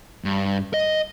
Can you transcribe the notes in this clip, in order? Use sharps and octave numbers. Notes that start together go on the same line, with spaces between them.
G2
D#5